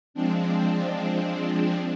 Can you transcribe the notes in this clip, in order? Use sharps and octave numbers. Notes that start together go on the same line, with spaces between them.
F3 G#3 C4 D4